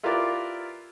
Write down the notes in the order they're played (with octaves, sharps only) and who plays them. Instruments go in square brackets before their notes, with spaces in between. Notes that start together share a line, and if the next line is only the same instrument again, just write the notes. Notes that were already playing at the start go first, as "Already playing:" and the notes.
[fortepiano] E4 F4 G4 A#4 B4 D5